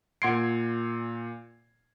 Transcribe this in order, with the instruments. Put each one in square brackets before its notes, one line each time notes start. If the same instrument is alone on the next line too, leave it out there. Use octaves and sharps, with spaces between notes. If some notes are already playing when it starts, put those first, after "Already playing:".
[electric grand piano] A#2 G#6 C7 [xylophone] F#5 C6 D7